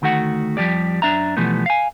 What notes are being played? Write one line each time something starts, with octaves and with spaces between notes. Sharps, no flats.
D2 D#3 A3 F#4 F#5
F2 F3 G3 G4 D5
F#2 D4 E5 A#5
B2 E3 F3 G3 A3 B3
F5 G#5